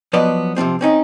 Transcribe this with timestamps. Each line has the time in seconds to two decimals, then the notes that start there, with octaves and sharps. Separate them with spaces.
0.13 F3 F#3 B3 D5 D#5
0.56 C3 D#3 F3 C4
0.81 C4 C#4 D#4